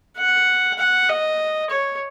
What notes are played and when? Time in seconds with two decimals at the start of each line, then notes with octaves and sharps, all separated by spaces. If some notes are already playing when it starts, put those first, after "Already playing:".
0.18 F#5
0.79 F#5
1.09 D#5
1.70 C#5